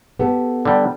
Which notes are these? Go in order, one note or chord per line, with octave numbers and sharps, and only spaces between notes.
B3 G4 A4
D3 G3